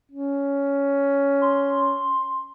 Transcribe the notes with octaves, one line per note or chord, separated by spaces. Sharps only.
C#4
C6